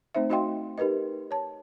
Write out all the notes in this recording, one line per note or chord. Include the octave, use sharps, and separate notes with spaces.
A3 C4 D#4 C5 E5
D#4 F#4 D#5 F5 G5 C6
D#4 G4 A#4 B4 D#5
C#5 A5